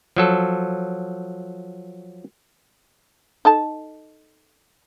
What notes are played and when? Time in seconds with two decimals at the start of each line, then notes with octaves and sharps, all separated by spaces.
0.16 F3 F#3 A4
3.45 D#4 A4 A5